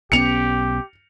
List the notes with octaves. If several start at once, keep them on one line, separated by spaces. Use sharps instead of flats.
B1 B3 C#4 G4 C#7 F7